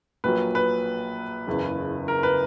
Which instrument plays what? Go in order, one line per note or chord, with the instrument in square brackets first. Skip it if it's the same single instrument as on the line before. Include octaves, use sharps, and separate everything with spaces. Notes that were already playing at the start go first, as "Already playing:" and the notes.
[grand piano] A#1 A#2 F#3 B4
B4
F#1 E2 C#3
A#4
B4